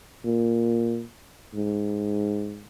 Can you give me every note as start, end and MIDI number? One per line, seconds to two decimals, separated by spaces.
0.25 1.04 46
1.55 2.67 44